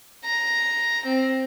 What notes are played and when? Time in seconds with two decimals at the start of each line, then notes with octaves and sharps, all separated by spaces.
0.25 A#5
1.05 C4